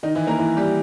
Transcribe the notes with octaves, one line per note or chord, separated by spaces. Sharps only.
D#3 D#4
E3 E4
A#3 A#4
E3 E4
G3 G4